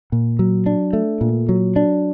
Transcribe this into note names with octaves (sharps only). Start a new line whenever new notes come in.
A#2
F#3
D4
A3
A#2
F#3
D4